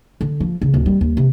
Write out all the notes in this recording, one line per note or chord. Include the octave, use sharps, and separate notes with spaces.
D3
F3
C#3
D1
G3
D#2
C3